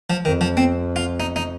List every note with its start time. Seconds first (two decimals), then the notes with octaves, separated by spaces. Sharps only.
0.10 F3
0.25 F2 D#3
0.41 F3
0.57 C4
0.96 F4
1.20 D#4
1.36 D#4